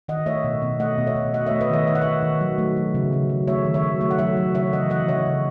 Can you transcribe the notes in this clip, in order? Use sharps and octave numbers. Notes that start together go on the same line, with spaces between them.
D#3 D#5 F#5
A3 C#5 E5
B2
B2
A3 D#5 F#5
B2
C#5 E5
B2
A3 D#5 F#5
A3 C#5 E5
B4 D#5
D#3 C#5 E5
D#3 E5
F#5
D#3 C#5 E5
D#3
F#3
A3
F#3
C#3
F#3
F#3
A3 C#5 E5
D#3
C#5 E5
F#3
A3 E5
F#5
F#3 C#5 E5
F#3
C#3 C#5 E5
E3 D#5 F#5
E3 D#5 F#5
C#3 C#5 E5
C#3